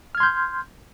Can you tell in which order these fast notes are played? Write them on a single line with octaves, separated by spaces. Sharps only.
F6 G#6 C6 G6